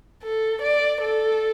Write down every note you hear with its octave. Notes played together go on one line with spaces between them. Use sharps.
A4
D5
A4